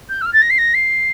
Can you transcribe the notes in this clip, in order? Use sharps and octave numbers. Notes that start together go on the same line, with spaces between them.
G6
E6
F6
A6
A#6
C7
A#6
C7